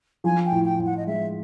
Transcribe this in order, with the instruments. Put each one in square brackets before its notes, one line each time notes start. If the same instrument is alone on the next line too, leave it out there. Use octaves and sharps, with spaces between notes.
[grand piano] F3 [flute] G#5
[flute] G5
[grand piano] A2
[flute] G5
[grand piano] A2
[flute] F#5
D#5
[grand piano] G#3 [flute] E5